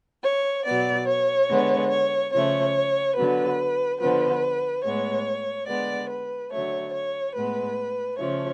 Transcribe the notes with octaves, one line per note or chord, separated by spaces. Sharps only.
C#5
B2 F#3 B3 D5
C#5
D3 G#3 B3
C#5
C#3 F3 A3 C#5
D3 F#3 B3 B4
D3 F3 B3 B4
A2 G#3 B3 C#5
D3 G#3 B3 D5
B4
D3 F#3 A3 C#5
C#5
A2 G#3 B3 B4
C#3 F3 A3 C#5